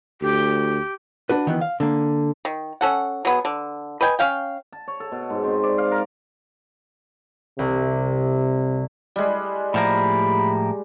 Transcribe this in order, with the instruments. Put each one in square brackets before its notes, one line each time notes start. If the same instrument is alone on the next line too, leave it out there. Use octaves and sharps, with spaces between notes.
[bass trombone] D2 [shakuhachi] G4
[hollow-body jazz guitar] D4 F#4 B4
D#3 E3 B3
F5
D3 A#3
[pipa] D#3
C#4 A4 F#5
F#3 B3 G#4
D3
B4 D#5 G5 G#5
C#4 F5 G5
[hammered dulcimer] A5
C#5
A4
B2
G#2
C4
D5
F5
A#4
[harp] C2 [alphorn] C3
[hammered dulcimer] G3 G#3
[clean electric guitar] A2 F3 A#3 [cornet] B5